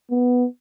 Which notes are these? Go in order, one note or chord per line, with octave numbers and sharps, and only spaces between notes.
B3